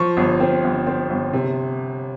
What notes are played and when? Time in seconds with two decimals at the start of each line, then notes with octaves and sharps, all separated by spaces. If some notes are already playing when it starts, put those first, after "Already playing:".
Already playing: F3 C#6
0.17 G1
0.40 C4
0.64 G1
0.87 C4
1.10 G1
1.33 C3